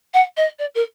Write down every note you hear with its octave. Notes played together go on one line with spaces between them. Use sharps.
F#5
D#5
D5
A#4